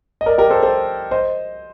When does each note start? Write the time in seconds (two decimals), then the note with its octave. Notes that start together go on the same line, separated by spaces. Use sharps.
0.21 D#5
0.26 A#4 D5
0.38 G4 A#4
0.50 A4 C5
0.63 A4 C5
1.11 C5 D#5